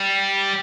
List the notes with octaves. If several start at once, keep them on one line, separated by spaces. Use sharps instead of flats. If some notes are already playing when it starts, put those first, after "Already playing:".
Already playing: G3